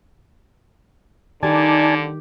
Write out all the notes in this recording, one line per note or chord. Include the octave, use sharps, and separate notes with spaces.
D3 D#3 D#4 G4 D5 G#5 A5